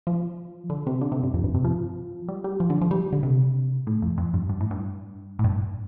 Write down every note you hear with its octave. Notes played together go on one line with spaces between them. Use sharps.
F3
D3
C3
D3
C3
G2
F2
G2
C3
F3
G3
G3
F3
D3
F3
G3
D3
C3
A2
F2
F2
G2
G2
A2
G2
A2
G2